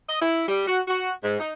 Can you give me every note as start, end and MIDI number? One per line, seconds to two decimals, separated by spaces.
0.08 0.18 75
0.20 0.44 64
0.48 0.64 55
0.67 0.79 66
0.87 1.11 66
1.22 1.37 44
1.40 1.52 63